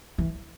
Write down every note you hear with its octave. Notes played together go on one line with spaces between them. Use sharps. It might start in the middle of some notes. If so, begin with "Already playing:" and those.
E3